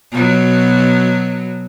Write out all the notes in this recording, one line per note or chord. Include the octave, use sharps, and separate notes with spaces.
B2 F#3